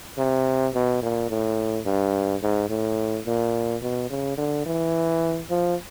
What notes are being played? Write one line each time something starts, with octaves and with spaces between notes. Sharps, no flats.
C3
B2
A#2
A2
G2
G#2
A2
A#2
B2
C#3
D3
E3
F3